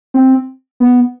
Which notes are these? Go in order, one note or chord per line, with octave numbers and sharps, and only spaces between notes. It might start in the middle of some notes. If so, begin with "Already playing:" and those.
C4
B3